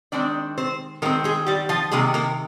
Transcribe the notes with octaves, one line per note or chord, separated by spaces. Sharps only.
D#3 G#3 C4 D4 D5
C4 C5
D#3 G#3 A#3 C4 A#4
G#3 G#4
G3 G4
F3 F4
C3 D#3 G#3 A#3 G#4
A#3 A#4